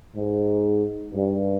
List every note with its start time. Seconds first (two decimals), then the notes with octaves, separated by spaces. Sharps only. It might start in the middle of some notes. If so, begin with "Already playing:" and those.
0.17 G#2
1.14 G2